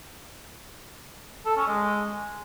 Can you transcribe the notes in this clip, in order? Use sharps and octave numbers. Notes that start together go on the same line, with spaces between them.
A4
C#4
G#3